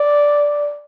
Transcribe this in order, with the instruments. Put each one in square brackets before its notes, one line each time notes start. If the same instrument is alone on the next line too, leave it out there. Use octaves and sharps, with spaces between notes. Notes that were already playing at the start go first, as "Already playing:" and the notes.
Already playing: [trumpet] D5